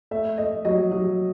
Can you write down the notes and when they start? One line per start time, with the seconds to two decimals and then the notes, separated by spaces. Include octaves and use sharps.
0.11 A3 E5
0.38 A3 D#5
0.65 F#3 D#5
0.92 F#3